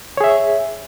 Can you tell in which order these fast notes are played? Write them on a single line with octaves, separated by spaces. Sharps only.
C#5 G#4 E5